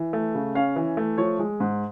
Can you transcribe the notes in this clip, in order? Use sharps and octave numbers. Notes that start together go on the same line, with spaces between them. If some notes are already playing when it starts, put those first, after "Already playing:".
Already playing: E3
A3
C#3
C#4 F5
E3
A3
F3 C#5
G#3
G#2